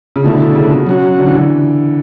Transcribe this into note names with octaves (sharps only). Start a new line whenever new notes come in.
C#3
B2 D3 A3 E4
C#3
B2
F#3 C#4 F#4
D3
E3
D3